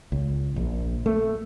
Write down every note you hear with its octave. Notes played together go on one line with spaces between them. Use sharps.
C#2
A#1
A3